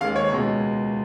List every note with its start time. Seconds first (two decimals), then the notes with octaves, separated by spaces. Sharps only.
0.01 D#2 D#3 G#3 F5
0.16 C#5
0.29 C#2 B2 G#3